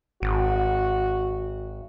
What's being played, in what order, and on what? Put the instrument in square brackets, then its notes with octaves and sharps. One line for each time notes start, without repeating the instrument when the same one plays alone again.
[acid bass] G#1 [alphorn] F#4